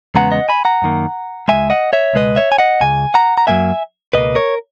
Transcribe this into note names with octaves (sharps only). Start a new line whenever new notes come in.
E2 C#3 G#3 B3 F#5 A#5
D#5 F#5
G#5 B5
F#5 A#5
F#2 D#3 A#3
C#2 C#3 G#3 E5 G#5
D#5 F#5
C#5 E5
C#2 B2 G#3 B4 D#5
C#5 E5
G#5
D#5 F#5
C#2 C#3 G#5
F#5 A#5
A#5
F#2 C#3 F#3 A#3 E5 G#5
C#2 B2 A#3 B4 D#5
A#4 C#5